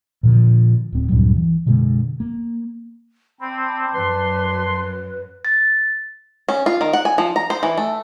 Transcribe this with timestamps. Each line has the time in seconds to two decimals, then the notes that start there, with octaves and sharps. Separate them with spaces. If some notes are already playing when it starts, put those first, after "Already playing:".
0.23 A#2 D3 F3
0.92 D1 C4
1.09 D2 G2 A#2 F#3
1.36 E3
1.66 F#2 B2 D3 G#3
2.20 A#3
3.40 C4 D5 A5 B5
3.94 F#2 B4 C6
5.45 A6
6.49 C#4
6.66 F4
6.81 D#3
6.93 F#5
7.05 G#5
7.18 F3
7.36 A#5
7.50 C5
7.63 E3
7.78 A3